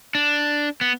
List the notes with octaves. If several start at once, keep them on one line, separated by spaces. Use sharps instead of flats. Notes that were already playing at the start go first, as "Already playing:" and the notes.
D4
B3